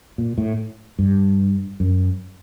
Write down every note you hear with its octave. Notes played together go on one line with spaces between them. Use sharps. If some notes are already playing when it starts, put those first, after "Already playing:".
A#2
A2
G2
F#2